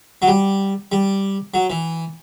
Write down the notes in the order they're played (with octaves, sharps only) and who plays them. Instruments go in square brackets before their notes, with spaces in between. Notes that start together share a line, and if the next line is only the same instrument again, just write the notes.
[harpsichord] F#3
G3
G3
F#3
E3